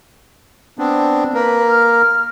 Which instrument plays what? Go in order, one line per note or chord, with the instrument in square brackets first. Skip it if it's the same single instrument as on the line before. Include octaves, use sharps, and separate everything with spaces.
[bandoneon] B3 C4 D4
[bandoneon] A#3 A#4 [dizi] B4
[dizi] F6